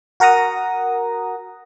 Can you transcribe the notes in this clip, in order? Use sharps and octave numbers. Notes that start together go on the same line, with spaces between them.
F#4 A#4 F#5 A#5 D#6